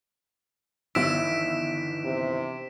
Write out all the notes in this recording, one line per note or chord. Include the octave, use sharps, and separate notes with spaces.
G1 D#3 E3 E5 E6 B6 D7 E7
C3